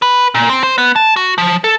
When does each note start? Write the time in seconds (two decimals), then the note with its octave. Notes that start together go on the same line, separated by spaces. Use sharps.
0.02 B4
0.35 A#2
0.49 C4
0.63 C5
0.78 B3
0.96 A5
1.16 F#4
1.38 F3
1.64 A4